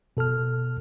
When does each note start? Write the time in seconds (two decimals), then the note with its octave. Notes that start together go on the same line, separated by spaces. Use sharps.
0.17 B2 A4 A5 F6